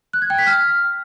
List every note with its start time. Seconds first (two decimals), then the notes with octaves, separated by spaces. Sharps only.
0.13 F#6
0.22 G#6
0.30 G5
0.38 B6
0.47 F6